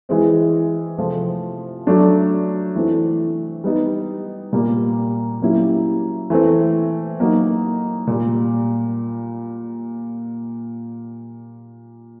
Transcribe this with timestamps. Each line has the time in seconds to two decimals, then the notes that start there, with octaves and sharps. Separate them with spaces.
0.09 E3 G#3 C4
0.98 C3 F3 A3 C4 F4
1.87 F#3 A3 D4
2.75 E3 A3 C4 E4
3.64 G3 B3 D#4
4.53 A#2 G3 A#3
5.41 F#3 A#3 C#4 E4 G4
6.30 E3 A3 C4
7.19 F#3 A#3 D#4 F#4
8.07 A#2 G3